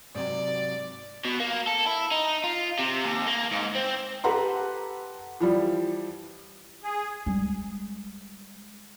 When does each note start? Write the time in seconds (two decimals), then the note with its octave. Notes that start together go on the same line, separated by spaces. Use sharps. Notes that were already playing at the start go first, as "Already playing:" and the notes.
0.15 G#2 C3 F#3 D5
1.25 B2
1.40 A#3
1.67 A4
1.86 E4
2.11 D#4
2.44 F4
2.79 C3
3.05 D#2
3.27 A#3
3.51 G#2
3.75 C4
4.24 G4 A4 B4 F#5 A#5 C6
5.40 E3 F3 G3
6.83 G#4
7.26 G3 G#3